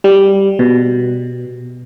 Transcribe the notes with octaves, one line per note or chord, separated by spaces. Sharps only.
G3
B2